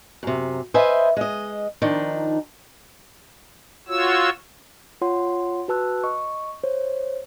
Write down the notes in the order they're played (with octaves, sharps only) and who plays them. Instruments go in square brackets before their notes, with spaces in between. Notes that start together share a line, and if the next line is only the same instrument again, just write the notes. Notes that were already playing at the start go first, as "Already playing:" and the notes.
[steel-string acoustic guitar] F#2 C3
B4 C5 D#5 E5 G#5
G#3 D#5
D#3 F3 D4 D#4
[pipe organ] F4 F#4 C#5 E6
[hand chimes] F4 C#5 F#5 C6
F#4 B4 A5 E6 F#6
D#5 C#6
C5 C#5